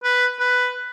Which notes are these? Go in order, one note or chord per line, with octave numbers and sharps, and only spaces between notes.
B4
B4